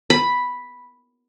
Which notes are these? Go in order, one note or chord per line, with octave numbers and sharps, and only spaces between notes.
B5